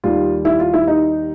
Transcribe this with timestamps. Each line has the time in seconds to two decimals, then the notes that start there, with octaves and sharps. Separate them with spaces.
0.04 D#2 D#3 G3 F4
0.45 E4
0.60 F4
0.73 E4
0.88 D#4